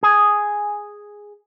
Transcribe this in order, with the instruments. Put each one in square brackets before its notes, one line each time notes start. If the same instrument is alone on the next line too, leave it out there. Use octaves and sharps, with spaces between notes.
[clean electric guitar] G#4